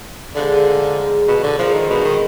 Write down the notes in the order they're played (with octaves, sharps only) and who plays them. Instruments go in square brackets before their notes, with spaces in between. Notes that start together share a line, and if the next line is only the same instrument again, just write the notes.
[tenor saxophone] D3 [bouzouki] F3 G#3 D#4 G#4
[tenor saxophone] B2
D3
[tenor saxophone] F3 [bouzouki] G#3 D#4 A#4
[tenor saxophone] D#3
B2
D#3